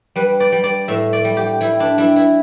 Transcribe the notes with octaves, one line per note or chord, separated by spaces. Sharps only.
G3 B4
D5
G3
D5
A2 E5
D5
G3
G4
G3 E4
D4
G3 E4
E4